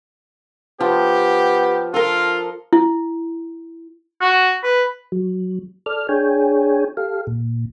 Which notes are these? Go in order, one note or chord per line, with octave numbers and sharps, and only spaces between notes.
F3 B3 G4
F4 A4 A#4
E4
F#4
B4
F#3
A4 D5 F6
D4 G#4 C#5 G5 G#5
G4 A4 F5
A#2